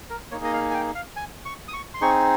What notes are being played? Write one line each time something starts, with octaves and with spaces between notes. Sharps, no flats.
A#4
A#3 D#4 G#4 C#5
D#5
F5
G#5
G5
F5
G#5
C#6
D#6
C#6
C6
C4 D#4 G#4 C#6